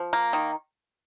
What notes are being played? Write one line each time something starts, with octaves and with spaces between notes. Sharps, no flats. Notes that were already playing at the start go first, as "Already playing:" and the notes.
Already playing: F3
A#3
D#3